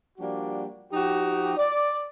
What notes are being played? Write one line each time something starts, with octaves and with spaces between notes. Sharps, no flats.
F3 G3 A#3 D4 F#4
F3 D#4 F#4 G4
D5